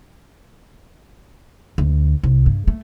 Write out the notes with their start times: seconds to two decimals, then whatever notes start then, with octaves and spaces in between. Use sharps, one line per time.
1.78 D2
2.23 C2
2.46 G2
2.67 A3